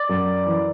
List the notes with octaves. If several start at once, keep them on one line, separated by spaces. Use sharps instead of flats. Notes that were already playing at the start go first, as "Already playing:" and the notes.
Already playing: D5
F#2
E3